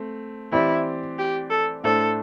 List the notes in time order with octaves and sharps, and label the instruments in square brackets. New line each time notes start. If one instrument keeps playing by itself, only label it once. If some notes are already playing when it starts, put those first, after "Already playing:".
Already playing: [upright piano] A3 C4
[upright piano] E3 C4 G4 D5 [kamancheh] E4
[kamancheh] G4
A4
[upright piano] A2 A3 D4 C5 [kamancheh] A4